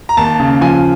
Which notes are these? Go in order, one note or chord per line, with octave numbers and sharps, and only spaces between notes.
A#5
D#2 A5
C#3
F3 G#5